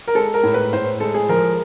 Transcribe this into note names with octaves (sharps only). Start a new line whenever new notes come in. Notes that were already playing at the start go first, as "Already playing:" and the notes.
A#4
G#3 A4
A#4
A2
B4
A2 C5
G#3 A4
G#4
F3 A#4